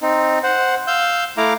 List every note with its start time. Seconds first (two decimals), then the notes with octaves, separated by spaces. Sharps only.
0.02 C4 D#4
0.43 C5 F#5
0.87 F5 E6 G6
1.37 A3 E4 F5 A#5 D6